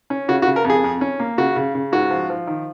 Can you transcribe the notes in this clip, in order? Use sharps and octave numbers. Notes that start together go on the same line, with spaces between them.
C#4
C#3 F#4
F#4
C#3
A#4
F2
G#4
F2
C#4
A#3
C#3 F#4
C#3
C#3
G#2 F#4
F3
F3
D#3